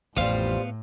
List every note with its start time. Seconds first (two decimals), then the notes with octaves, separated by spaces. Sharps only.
0.17 A1 F2 A2 G3 B3 F4 C5 F5